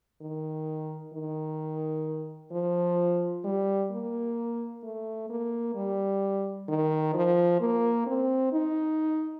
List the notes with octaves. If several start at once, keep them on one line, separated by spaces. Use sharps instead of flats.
D#3
D#3
F3
G3
A#3
A3
A#3
G3
D#3
F3
A#3
C4
D#4